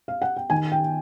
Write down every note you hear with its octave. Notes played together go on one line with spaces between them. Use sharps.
F5
F#5
G5
D#3 G#5
G5